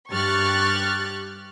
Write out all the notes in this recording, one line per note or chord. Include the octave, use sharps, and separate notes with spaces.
G2 G4 C#6 F6 F#6 A6